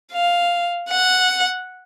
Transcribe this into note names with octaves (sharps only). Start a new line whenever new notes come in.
F5
F#5